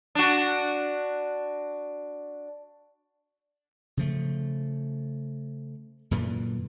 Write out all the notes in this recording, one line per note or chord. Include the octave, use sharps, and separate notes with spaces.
D4 F#4
C#3 F3 A3
F#2 A#2 D3 E3